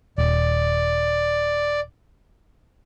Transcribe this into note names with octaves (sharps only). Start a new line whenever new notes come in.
D#1 D5